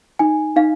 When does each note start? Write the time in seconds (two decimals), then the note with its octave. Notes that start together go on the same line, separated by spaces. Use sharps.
0.19 D#4 G#5
0.56 D#4 F5